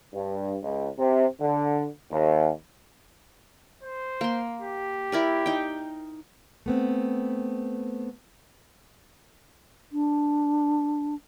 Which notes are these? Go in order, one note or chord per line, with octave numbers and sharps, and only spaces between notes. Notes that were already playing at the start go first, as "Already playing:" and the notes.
G2
C#2
C3
D3
D#2
C5
A#3 C6
G4
E4 A#4 D5
D#4 G5
A3 B3 C4
D4